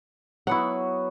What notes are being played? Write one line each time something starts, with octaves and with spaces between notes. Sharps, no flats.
F#3 B3 E4 F#4 F#5